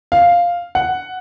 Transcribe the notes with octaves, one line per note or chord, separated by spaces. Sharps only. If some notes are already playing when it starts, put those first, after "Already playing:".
F5
F#5